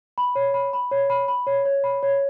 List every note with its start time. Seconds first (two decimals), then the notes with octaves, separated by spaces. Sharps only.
0.18 B5
0.35 C#5
0.54 B5
0.73 B5
0.91 C#5
1.10 B5
1.28 B5
1.47 C#5
1.65 C#5
1.84 B5
2.03 C#5